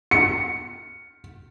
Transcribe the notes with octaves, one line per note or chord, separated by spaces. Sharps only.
C#7